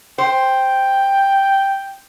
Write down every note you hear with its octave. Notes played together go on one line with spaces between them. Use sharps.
C5 G5